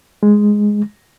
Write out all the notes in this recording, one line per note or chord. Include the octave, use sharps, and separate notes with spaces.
G#3